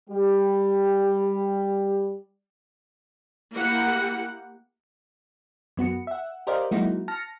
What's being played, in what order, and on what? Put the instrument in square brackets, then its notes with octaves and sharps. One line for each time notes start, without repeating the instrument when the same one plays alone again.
[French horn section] G3 G4
[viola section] A#3 E4 G4 F#5
[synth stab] F#2 B3 F#4 C#7
E5 F#5
G4 A#4 C5 D5 D#5 F5
F#3 G#3 A#3 D#4 E4 F#4
A5 F6 A#6 C#7